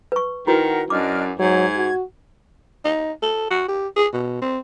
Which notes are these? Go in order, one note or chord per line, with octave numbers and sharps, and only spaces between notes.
B4 C#6
D#3 E4 F#4 A#4 B4 F#5
F#2 D4 D#5 D6 F6
G#2 F#3 G#6
F#4
D#4
A4
F#4
G4
G#4
B2
C4